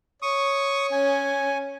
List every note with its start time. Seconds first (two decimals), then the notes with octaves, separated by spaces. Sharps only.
0.22 C#5 C#6 D#6
0.92 C#4 G#5